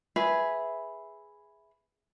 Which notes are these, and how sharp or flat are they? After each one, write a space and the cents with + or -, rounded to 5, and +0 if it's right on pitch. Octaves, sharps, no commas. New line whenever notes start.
G#4 +0 B4 +0 E5 -5